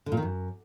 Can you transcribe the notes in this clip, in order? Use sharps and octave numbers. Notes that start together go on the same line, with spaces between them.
D3
A#2
D#3
F#2